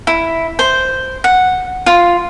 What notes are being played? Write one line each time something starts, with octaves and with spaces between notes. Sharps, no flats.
E4
C5
F#5
F4